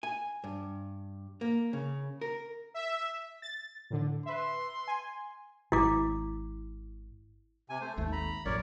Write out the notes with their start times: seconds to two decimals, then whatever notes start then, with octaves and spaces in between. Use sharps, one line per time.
0.03 G#5
0.44 G2
1.41 A#3
1.73 C#3
2.21 A#4
2.74 E5
3.42 A6
3.90 A2 D3
4.26 B4 E5 C6
4.88 G#5
5.72 G#1 E4 D6
7.69 C3 G#5
7.81 A3 C5
7.97 G#1 D#2 A3
8.12 A#5 B5
8.45 A1 F#2 A#4 C#5 D5